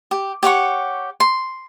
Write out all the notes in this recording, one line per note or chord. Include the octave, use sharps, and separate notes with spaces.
G4
G4 C#5 F#5 C#6
C6